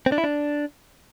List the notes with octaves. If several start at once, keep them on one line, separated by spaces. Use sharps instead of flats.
C4
D4
E4
D4